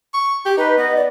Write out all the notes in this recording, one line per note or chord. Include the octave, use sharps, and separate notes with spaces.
C#6
G4
D#4 B4
B3 D#5
D5